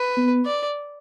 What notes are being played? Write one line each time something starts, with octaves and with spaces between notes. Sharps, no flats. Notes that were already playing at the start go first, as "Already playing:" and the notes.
Already playing: B4
B3
D5